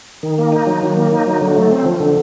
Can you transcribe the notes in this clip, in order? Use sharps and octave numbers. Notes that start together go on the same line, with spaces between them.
D#3
A#3
D#4
F#3
D#3
A#3
D#4
F#3
D3
A3
C4
F3
D3